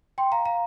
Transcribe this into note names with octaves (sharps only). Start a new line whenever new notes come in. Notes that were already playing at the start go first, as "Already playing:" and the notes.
G5 C6
F5 A#5
F5 A#5